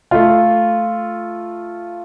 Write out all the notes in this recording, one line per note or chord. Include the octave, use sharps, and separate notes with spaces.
A3 F4